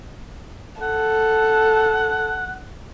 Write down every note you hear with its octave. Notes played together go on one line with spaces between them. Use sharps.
A4 F#5